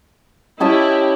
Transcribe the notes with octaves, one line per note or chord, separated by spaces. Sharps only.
C#4 E4 G4 D#5 A5